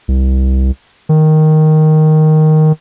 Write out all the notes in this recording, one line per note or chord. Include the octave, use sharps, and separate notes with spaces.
C2
D#3